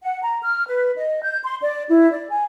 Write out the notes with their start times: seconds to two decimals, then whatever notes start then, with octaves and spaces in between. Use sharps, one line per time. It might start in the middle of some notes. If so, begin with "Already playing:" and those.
0.02 F#5
0.22 A#5
0.42 F6
0.68 B4
0.96 D#5
1.22 G6
1.43 C6
1.61 D5
1.89 E4
2.11 D5
2.29 G#5